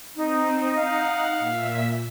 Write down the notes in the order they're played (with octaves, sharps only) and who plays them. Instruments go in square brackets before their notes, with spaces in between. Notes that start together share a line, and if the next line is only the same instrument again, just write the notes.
[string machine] C4 [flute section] D#4
[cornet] F5 [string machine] F#5
[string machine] A#2 E5 B6